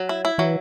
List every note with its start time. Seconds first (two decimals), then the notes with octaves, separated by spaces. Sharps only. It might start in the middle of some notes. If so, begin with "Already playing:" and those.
Already playing: F#3
0.09 E4
0.25 E4
0.38 E3 F#3